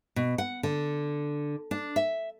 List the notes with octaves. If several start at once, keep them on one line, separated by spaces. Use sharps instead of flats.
B2
F#5
D3
D4
E5